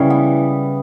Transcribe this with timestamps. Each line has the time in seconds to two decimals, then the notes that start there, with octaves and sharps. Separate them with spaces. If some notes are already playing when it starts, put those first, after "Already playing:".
Already playing: C#3 E3 G3
0.10 B3